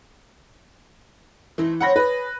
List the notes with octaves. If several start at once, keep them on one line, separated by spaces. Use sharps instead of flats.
E3 A3 C4 D#4
F#3 C4 C#5 F#5 B5 A#6
C#4 G#4 B4